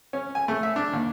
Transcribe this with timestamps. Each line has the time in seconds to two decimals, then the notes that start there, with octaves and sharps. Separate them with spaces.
0.13 C#4
0.35 G#5
0.48 A3
0.63 E5
0.76 D4
0.93 D#2